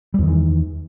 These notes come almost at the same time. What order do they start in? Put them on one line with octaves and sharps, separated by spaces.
G3 E2 D#3 E3